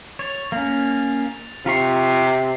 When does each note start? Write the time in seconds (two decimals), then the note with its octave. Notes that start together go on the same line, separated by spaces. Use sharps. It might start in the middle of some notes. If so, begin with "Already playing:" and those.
0.19 C#5 A6 F7
0.52 A#3 C#4
1.66 C3 F4 A#5 C#6 B6 C7